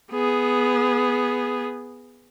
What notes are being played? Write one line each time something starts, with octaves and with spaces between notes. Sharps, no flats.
B3 G#4